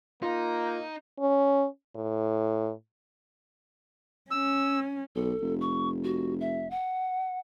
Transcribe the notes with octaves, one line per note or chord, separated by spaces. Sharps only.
A#3 D#4 F4
C#4
A2
C#4 E6
B1 A4
F1
C#6
F#4
E5
F#5